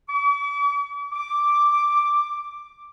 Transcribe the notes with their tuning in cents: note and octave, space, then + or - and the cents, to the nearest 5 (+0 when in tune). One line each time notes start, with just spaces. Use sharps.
D6 -45
D6 +0